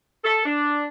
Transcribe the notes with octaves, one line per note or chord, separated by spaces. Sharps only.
A4
D4